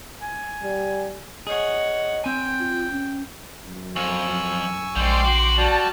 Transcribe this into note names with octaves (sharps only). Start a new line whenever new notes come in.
G#5
G3
G#4 C#5 D#5 F#5
C4 G5 G#5
F4
C#4
F#2
F2 G#5 C#6 E6
A#1 G#2 G3 G5 C6 D6
F#4
G3 F#4 D5 A5